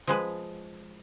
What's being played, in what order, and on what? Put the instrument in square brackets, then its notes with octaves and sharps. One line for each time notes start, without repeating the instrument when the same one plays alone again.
[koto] F3 G#3 B4